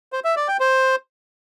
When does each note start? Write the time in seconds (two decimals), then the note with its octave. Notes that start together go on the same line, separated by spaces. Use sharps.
0.12 C5
0.24 E5
0.36 D5
0.48 G5
0.60 C5